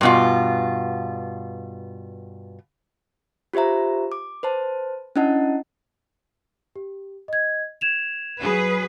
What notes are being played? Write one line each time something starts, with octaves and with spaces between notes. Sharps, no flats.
G2 B2 F4
F4 G4 C5 E5 A#5
D6
B4 C5 A5
C#4 D4 E4 D#5 F#5 A5
G4
D#5 G#6
G#6 E7 F7
F#3 G#4 B4